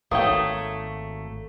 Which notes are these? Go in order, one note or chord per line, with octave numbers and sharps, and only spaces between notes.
G#1 A3 A#3 C#5 G5 D#6